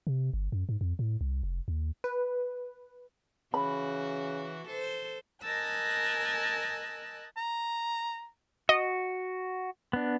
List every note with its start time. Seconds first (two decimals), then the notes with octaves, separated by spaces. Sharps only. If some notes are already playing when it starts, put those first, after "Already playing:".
0.07 C3
0.34 G1
0.52 F#2
0.69 G#2
0.81 F2
0.99 A2
1.21 C2
1.43 F1
1.68 D#2
2.04 B4
3.54 C#3 E3 F#4 B5
4.68 A4 C5
5.42 A#4 D#5 G#5 A5 E6 F#6
7.37 A#5
8.69 F#4 D#5
9.93 B3 D4